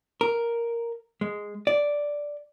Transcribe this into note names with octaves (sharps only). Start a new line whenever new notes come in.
A#4
G#3
D5